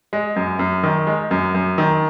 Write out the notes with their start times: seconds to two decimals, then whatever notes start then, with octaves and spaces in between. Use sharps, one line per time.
0.13 G#3
0.36 F#2
0.59 F#2
0.83 D#3
1.07 G#3
1.31 F#2
1.55 F#2
1.78 D#3